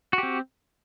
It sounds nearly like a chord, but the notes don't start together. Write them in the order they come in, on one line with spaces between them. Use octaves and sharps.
F#4 G4 C4